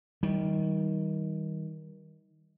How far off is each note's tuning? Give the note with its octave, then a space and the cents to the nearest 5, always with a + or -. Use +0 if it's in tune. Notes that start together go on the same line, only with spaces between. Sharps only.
D#3 +25 G3 -15